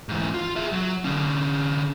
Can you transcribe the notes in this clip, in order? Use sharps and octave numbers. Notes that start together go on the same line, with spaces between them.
G#2 E3
F4
G#4 E5
F#3
D3 C#4